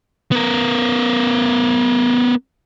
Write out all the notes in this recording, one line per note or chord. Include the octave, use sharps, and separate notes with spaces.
B3 A#4